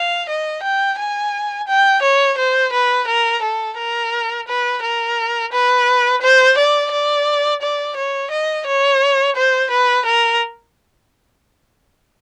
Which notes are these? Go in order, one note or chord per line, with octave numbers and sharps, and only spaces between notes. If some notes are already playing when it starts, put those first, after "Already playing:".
Already playing: F5
D#5
G5
G#5
G5
C#5
C5
B4
A#4
A4
A#4
B4
A#4
B4
C5
D5
D5
D5
C#5
D#5
C#5
C5
B4
A#4